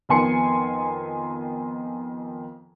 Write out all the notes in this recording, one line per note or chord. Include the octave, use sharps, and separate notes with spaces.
F2 D#3 B3 G#5 C6 C#7